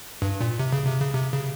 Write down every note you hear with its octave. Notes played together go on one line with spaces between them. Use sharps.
G2
A#2
C3
C#3
C3
C#3
C3
C#3